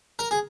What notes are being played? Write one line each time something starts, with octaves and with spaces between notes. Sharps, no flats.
A#4
G#4